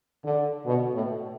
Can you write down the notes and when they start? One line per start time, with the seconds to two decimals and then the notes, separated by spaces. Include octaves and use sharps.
0.24 D3
0.66 B2
0.94 A2